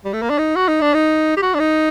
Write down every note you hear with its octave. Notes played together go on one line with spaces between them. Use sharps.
G3
A3
A#3
D4
D#4
F#4
D#4
D4
D#4
G4
F#4
D4
D#4